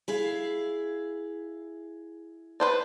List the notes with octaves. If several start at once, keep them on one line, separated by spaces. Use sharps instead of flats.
E4 G#4 F5
B4 C5 D5